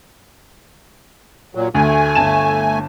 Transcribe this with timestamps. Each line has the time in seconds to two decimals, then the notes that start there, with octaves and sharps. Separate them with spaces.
1.55 A#2 F#3
1.75 D2 A3 G#5
2.15 G1 A5 E7